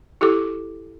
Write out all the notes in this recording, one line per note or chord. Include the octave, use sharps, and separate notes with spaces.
E4 G4 A4 D6